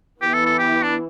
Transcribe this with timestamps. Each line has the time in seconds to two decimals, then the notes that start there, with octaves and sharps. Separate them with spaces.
0.22 E3 B3 E4 G4
0.33 A4
0.46 A4
0.59 G4
0.83 D4